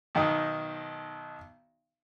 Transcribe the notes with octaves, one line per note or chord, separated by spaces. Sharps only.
B1 D#3 D#4